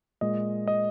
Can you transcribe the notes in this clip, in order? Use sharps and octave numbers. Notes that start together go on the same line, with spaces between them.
A#2 G#3 D#5
D#5